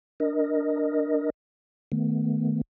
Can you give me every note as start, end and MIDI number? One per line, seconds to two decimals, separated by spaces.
0.20 1.30 62
0.20 1.30 70
0.20 1.30 75
1.92 2.61 51
1.92 2.61 57
1.92 2.61 59